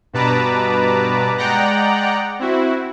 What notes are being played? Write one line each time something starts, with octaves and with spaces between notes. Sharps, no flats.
G2 B2 B4 A5 A#5 D6
G#3 D5 F#5 G5 A#5 F#6
C4 E4 F#4